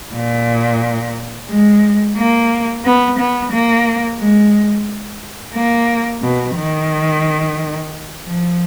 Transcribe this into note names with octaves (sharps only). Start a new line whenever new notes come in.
A#2
G#3
A#3
B3
B3
A#3
G#3
A#3
B2
D#3
F3